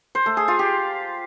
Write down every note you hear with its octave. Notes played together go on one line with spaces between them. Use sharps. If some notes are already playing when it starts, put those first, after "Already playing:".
C5
A3
G#4
F4
G4